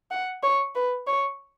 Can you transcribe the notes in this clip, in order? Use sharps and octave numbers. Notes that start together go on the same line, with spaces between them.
F#5
C#5
B4
C#5